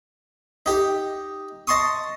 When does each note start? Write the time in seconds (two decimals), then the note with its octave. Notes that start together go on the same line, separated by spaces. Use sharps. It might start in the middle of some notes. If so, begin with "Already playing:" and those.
0.66 D#4 G4
1.67 D#5 A5 C6 C#6 D#6